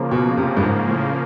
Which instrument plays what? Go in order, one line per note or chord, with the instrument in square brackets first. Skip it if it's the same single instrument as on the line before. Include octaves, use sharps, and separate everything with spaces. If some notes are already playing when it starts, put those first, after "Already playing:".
Already playing: [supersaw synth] C#3 F3 A#3
[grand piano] B2
C3
G2
G#2
A2